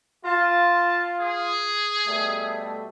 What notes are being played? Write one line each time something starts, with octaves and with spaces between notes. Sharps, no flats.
F4 A5
G#4
B2 G3 A3